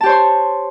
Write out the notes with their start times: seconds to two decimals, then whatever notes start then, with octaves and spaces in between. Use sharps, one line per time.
0.01 A5
0.03 G4
0.06 C5
0.09 C#5
0.12 C6